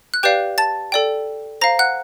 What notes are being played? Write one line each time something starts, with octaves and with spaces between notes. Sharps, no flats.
F#6
G4 B4 D5 F5 G5 G6
A5 A6
A4 D5 G5
C5 F5 A#5 A#6
F#5 F#6